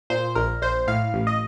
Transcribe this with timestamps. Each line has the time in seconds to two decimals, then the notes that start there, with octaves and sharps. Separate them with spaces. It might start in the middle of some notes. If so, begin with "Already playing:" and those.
0.10 A#2 C5
0.35 A#1 A#4
0.62 A#1 C5
0.87 A2 F5
1.14 A1
1.27 D#5